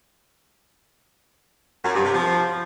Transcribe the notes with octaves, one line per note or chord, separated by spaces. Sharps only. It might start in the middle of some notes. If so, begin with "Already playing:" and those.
F#2
G2
C3
F3